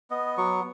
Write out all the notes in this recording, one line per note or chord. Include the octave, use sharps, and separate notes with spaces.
B3 D#5
F#3 C#6